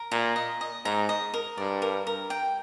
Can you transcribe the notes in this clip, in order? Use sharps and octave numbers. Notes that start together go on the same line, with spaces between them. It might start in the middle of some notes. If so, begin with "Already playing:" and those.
Already playing: A#4
A#2 A#5
D#5
D#5
G#2 A#5
D#5
A#4
G2 D5
A#4
A#4
G5